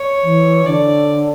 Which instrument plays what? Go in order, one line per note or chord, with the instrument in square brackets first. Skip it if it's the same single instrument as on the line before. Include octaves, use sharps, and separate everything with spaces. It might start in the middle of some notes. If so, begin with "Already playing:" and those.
Already playing: [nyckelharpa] C#5
[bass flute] E3
[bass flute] D3 [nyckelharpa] D5